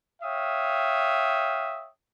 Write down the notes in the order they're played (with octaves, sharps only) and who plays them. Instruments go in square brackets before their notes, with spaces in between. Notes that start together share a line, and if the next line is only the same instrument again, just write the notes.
[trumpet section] C#5 E5 F5 G5 D#6